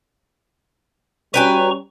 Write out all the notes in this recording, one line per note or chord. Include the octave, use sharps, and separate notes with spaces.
G3 C#4 F#4 B4 G5 G#5 A#5 C#6